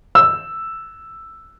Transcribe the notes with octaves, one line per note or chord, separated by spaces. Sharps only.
E6